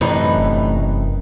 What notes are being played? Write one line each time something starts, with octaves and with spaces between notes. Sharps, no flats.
F#2 A2 C3 E3 D#4 B4
F1